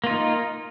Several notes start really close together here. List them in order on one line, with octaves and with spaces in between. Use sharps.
A#3 F4 D#4